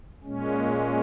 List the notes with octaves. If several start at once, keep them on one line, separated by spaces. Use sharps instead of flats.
A#2 G#3 C#4